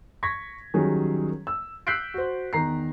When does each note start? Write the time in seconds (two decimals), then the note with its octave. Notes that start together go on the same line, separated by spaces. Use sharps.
0.23 C#6 G#6 A#6 B6
0.74 D#3 F#3 G3 C#4 G#4
1.47 E6
1.87 E6 F#6 G6 B6 C7 D7
2.14 F#4 C5
2.53 E2 D#3 A#5 C7